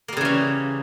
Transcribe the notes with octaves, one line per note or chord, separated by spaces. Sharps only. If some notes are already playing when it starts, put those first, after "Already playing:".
C#3 E3 G3 A#3 C#4